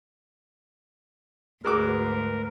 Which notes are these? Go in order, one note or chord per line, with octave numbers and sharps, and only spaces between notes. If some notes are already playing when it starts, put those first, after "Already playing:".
D2 G#2 G#3 F#4 A#4 B4 D6